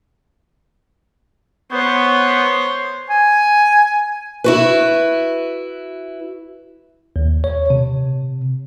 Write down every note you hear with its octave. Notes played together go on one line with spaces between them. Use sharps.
B3 C5 C#5
G#5
E4 F#4 B4
D#2
C#5
C3